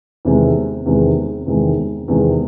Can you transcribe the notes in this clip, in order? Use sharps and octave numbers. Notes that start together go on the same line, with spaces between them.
E2 C3 D#3 G#3
E2 C3 D#3 G#3
E2 C3 D#3 G#3
E2 C3 D#3 G#3